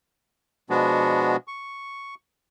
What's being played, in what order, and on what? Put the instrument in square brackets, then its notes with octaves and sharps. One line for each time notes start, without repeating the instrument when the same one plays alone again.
[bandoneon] B2 F3 G#3 B3 D4 F#4
C#6